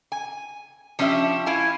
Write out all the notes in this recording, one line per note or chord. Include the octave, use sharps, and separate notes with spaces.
G#5
F3 C#4 D4 G4 E5
E4 F5 G#5